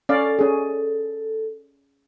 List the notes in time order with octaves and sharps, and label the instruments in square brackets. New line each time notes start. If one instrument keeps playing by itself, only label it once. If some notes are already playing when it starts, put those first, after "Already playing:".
[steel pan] C#4 D5 F5 [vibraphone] A4
[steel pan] C#4 G#4